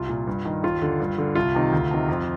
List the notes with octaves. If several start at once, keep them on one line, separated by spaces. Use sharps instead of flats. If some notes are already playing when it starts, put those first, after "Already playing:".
Already playing: C2 F4
A#2
G2
D#3
D#2 F4
D3
G2
D3
C2 F4
C3 D#3
D2
C3 D#3
F2